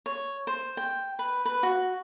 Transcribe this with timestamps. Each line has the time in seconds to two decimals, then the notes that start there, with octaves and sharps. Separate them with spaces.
0.06 C#5
0.47 C5
0.77 G5
1.19 B4
1.45 B4
1.63 F#4